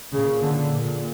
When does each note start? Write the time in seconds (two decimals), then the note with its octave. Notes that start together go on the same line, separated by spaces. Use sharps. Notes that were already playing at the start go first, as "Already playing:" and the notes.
0.12 A#2 C#3
0.42 D3
0.71 A#2